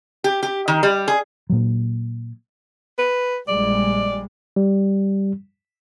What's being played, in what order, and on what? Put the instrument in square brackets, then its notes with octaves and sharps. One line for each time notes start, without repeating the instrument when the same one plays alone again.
[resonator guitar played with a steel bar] G4
G4
D#3
G3
G#4
[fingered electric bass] A#2 F#3
[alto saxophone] B4
[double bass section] A#1 G3 G#3 [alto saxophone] D5
[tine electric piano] G3